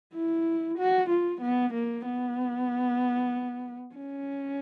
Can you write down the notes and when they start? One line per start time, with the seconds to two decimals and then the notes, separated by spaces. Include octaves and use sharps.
0.14 E4
0.79 F#4
1.10 F4
1.41 B3
1.74 A#3
2.05 B3
3.95 C#4